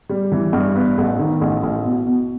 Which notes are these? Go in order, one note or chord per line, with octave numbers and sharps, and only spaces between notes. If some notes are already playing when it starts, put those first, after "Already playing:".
G3
E3
G2
B3
A1
D#3
A1
A1
B2
B2